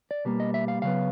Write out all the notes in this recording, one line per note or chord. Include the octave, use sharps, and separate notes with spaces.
D5
B2 G3 A#3
D#5
E5
F5
C#3 F#3 B3 F5